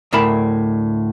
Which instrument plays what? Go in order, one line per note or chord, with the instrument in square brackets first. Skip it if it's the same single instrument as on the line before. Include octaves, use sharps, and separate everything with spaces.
[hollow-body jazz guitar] D2 A2 A#4 A5 B5